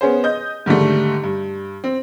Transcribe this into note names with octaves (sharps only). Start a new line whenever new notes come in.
B3 C#4 G#4 C5
D#5 G6
G#2 D3 D#3 G3 A3
G2
C4